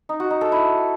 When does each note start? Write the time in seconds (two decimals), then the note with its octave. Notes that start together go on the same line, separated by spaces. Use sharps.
0.09 D#4
0.20 F#4
0.31 D#4
0.41 A4
0.52 E4